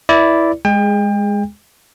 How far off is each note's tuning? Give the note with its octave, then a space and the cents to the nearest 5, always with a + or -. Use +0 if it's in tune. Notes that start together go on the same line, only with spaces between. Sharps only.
E4 +0 B4 -20 D5 -10
G#3 -10 G#4 +0 G5 +35